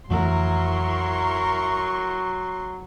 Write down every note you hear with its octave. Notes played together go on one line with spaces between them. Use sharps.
F2 E3 F#3 A3 E4 A#4 C6 C#6